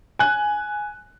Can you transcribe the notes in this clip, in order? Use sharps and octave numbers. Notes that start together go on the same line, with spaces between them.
G#5 F#6